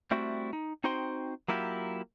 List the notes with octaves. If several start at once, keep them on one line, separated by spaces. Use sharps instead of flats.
G3 A3 C4 E4 F#4
D#4
C4 D#4 F#4 C5 G5 C6
F#3 A#3 E4 F4 G4